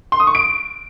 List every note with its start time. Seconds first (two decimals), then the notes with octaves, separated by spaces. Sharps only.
0.12 C6
0.20 D#6
0.27 C#6
0.35 D7